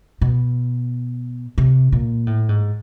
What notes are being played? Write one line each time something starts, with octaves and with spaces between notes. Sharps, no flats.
B2
C3
A#2
A2
G#2